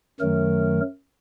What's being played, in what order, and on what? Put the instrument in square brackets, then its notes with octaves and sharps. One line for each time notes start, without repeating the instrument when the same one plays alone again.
[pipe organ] F#2 D#3 F#3 A3 A#4